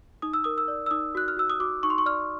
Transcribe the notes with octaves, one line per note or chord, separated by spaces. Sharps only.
D#4 D#6
E6
A#4 D#6
E6
D5
E6
D#4 D#6
F#4 F#6
F6
F#4 E6
D#6
F#4 D6
D#4 C#6
C6
C#6
D5 F6